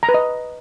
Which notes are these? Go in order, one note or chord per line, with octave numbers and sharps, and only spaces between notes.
A#5
B4
D#5